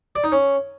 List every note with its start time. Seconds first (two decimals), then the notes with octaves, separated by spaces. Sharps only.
0.16 D5
0.24 D#4
0.32 C#4